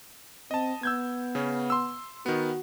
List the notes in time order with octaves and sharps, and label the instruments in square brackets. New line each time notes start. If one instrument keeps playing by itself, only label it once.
[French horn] C4 [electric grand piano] D#5 A5
[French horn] B3 [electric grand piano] E6 G6 G#6
[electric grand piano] C#3 C#4
C6 E6
[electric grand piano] D#3 B3 [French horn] F#4